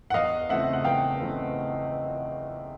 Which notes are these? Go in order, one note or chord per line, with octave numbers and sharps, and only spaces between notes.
F#5
E2 D#5 F5
C#3 E3 A3 C4 E5 F#5
F#5
E2 F5 G5
C#3 E3 A3 C4